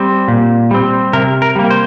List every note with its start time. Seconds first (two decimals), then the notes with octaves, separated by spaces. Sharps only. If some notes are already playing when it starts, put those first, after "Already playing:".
Already playing: G3 C4
0.28 A#2
0.71 G3 C4
1.13 C3 A#4
1.42 A#4
1.56 G3 A#3
1.70 C5